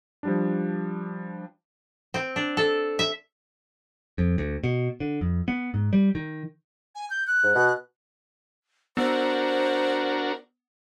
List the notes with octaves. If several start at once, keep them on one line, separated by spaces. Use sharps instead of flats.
F3 G3 D4
C4
D4
A4
E5
F2
D2
B2
D3
F2
B3
G#2
G3
D#3
G#5
G6
F#6
G#2
B2
B3 D4 F#4 A#4 C5